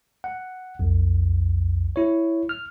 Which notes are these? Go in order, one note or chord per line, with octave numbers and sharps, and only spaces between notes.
F#5
B1 F2
E4 C#5
F6